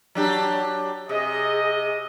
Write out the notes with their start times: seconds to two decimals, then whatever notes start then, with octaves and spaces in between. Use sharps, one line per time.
0.15 F#3 D4 G4
1.09 C3 G#4 D#5